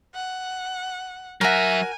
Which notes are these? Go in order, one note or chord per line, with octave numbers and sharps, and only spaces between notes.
F#5
F#3 F#4 A#4 E5 G#5